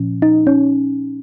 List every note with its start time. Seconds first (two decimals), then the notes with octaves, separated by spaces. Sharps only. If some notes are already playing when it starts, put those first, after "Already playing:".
Already playing: A#2 F3 C#4
0.22 D#4
0.47 C#4